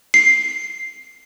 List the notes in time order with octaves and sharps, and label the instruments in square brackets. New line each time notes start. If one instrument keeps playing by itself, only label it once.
[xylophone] C7